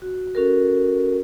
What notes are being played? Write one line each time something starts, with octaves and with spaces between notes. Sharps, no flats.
F#4
C#4 F#4 A4 A#4